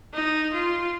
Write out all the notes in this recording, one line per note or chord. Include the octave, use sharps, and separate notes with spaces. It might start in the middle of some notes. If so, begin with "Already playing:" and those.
D#4
F4